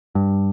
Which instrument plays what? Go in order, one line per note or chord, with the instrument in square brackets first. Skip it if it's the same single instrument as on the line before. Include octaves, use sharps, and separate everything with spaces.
[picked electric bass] G2